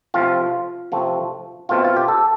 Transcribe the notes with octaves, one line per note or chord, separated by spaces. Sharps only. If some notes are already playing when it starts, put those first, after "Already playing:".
C3 F3 A3 C4 F4
C3 F3 A3 C4
B2 A3 C4 F4
F4
G4
A4